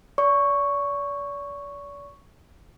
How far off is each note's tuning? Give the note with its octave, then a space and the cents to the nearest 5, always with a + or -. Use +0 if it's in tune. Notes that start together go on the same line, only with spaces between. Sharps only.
D5 -40 C#6 +0